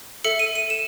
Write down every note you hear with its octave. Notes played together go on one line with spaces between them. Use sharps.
A4 E5 C#7
D#7
D#7
E7